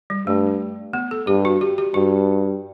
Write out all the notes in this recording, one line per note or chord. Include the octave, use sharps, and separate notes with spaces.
G3
G2 A3
B3
A4
G2 G4
F#4
G4
G4
G2 F#4